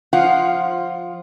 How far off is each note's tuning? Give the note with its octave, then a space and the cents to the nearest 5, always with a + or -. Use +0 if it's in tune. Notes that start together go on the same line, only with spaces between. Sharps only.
F3 +15 F4 +0 F#5 +10